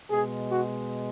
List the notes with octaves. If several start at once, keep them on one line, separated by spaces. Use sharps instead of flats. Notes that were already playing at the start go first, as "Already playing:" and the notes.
B2 G#3 G#4
F#4